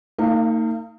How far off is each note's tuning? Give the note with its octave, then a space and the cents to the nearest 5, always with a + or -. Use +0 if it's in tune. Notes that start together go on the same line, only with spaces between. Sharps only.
A#3 -45 D#4 +15 F5 -15